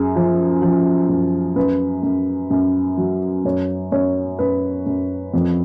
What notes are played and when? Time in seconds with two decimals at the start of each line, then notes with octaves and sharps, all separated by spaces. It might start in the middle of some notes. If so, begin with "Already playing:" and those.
Already playing: F#2 G#4
0.16 F3
0.62 F3
1.09 F#2
1.56 F#2 B4
2.03 F#2
2.51 F#2
2.97 F#3
3.45 F#2 C#5
3.92 F#2 C#5
4.39 F#2 B4
4.86 F#2
5.34 F2